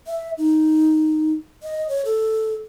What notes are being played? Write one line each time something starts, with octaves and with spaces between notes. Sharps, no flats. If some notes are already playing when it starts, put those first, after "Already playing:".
E5
D#4
D#5
C#5
A4